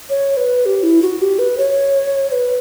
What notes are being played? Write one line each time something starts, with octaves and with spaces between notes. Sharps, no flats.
C#5
B4
G4
E4
F#4
G4
B4
C#5
B4